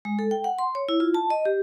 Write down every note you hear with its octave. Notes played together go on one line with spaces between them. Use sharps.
G#3
A4
G5
F#5
C6
C#5
E4
F4
A5
D#5
G4